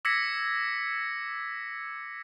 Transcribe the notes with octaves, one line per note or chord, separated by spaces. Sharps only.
D6 E6 G#6 A#6 B6 C#7